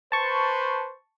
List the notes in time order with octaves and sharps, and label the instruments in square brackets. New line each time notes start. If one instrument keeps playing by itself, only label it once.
[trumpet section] B4 C5 [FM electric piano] A5 C#6